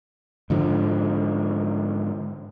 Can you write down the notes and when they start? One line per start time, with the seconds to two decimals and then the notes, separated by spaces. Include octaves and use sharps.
0.50 G#2 D3 F3